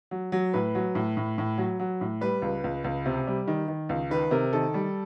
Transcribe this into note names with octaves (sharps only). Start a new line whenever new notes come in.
F#3
F#3
A2 B4
F#3
A2
A2
A2
F#3
F#3
A2
G3 B4
C#2
C#2
C#2
C3
G3
D#3
D#3
C#2
D#3 B4
C3 A#4
D#3 A4
G3